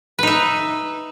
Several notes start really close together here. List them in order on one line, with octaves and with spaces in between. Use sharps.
B4 D#4 E5